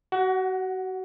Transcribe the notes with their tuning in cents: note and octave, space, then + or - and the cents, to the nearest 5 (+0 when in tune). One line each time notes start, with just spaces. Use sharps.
F#4 +30 F#5 +5